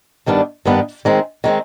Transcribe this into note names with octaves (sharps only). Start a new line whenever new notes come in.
G2 D#3 G3 B3 D4
G2 D#3 G3 B3 D4
D#3 G#3 C4
D#3 G#3 C4